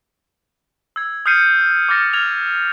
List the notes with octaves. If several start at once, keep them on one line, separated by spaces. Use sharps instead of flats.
E6 G#6
D#6 F6 G6 C7 C#7 D#7
D6 D#6 F6 A6 A#6 C#7
F6 G#6 F7